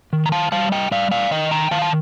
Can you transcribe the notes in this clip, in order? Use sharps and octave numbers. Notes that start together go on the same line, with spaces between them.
D#3
A#5
F5 A5
G3 F5 A5
D#5 G5
G3 D5 F5
D5 F5
D#3 D#5 G5
G5 A#5
D#3 F5 A5
A5